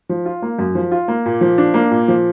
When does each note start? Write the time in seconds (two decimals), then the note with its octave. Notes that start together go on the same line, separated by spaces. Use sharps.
0.09 F3
0.25 F4
0.42 A#3
0.59 F#2
0.75 F3
0.91 F4
1.08 A#3
1.26 A#2
1.41 F3
1.58 D4
1.74 A#3
1.91 A#2
2.08 F3